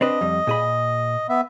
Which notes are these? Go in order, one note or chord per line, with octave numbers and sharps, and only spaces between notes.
C4 D4 B4 D#5
F2 G3
A#2 G#4 B5
B3 E5